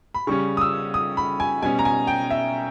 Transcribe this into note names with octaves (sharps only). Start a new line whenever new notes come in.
B5
C#3 G3 C#4 C#6
D#6
E6
D#6
B5
G#5
B2 G3 C#4 G#5
A#5
G#5
G5
E5